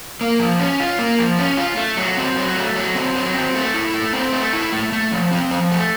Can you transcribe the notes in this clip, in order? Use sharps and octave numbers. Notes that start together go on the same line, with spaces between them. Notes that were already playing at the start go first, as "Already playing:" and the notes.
A#3
F3
C#4
F4
A#3
F3
C#4
F4
A3
F#3
C4
F#3
A3
F#3
C4
F#3
C4
A3
E4
A3
C4
A3
E4
A3
A3
F3
C4
F3
A3